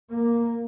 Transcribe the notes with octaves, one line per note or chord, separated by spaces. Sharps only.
A#3